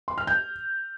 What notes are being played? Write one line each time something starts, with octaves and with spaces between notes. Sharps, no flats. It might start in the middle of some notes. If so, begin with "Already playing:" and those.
C6
F6
G6